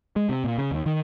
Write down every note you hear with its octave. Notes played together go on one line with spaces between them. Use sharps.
G#3
C3
A#2
C#3
D#2
D#3